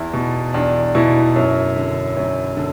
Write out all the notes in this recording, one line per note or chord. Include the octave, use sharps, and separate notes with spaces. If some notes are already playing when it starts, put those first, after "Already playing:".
Already playing: E2 E4
B2
E2 D4
B2 E4
F#2
D3
F#2
D3